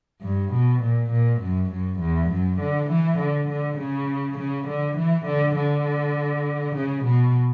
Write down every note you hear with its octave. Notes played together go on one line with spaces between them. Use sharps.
G2
B2
A#2
A#2
F#2
F#2
E2
F#2
D3
E3
D3
D3
C#3
C#3
D3
E3
D3
D3
C#3
B2